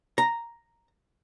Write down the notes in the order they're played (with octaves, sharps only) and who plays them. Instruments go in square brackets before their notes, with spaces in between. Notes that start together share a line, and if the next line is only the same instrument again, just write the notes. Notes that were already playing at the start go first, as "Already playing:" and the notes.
[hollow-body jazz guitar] A#5